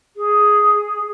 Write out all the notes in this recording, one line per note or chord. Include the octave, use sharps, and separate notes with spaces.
G#4